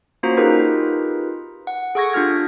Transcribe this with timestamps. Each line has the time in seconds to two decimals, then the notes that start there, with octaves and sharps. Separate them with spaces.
0.23 A#3 C#4 F4 F#4 C5 A#5
0.37 D#4 F4 G4 G#4 A#4 B4
1.67 F#5
1.95 G#4 A4 F#5 C#6 G#6 A#6
2.13 D4 F4 G4 F6 G#6